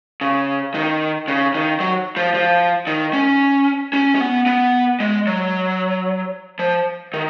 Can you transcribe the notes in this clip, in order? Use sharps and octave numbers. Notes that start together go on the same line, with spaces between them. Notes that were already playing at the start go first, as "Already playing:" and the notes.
C#3
D#3
C#3
D#3
F#3
F3
F3
D#3
C#4
C#4
C#4
B3
B3
G#3
F#3
F3
D#3